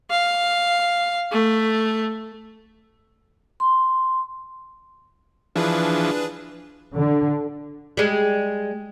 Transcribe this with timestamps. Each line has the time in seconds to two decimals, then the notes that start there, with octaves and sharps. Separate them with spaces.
0.11 F5
1.32 A3
3.60 C6
5.56 E3 F3 D4 G#4 B4
6.96 D3
7.97 G3 G#3